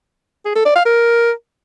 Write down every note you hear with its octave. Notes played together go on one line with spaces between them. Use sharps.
G#4
A4
D5
F5
A#4